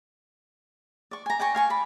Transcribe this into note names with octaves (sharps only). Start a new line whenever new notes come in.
D5 C#6
G#5 A#5
D5 G5 G#5 C#6
F5 G#5 C#6
D5 B5